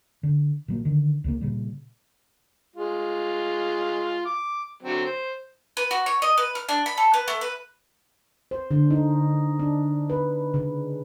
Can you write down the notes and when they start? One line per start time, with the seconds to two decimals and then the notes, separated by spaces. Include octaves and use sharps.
0.23 D3
0.68 A#2 F#3 A#3
0.85 D3 D#3
1.24 C#2 C#3 A#3
1.41 A#2 C#3 G3
2.76 G#3 F4
4.26 D6
4.83 D3 F#3 C4
5.05 C5
5.77 B4
5.91 F#4
6.06 C#5
6.22 D#5
6.38 B4
6.55 F6
6.69 D4
6.86 B5
6.98 A4
7.14 B4
7.28 A3
7.41 B4
8.51 C5
8.71 D3
8.90 D#4
9.59 D4
10.10 B4
10.54 C#3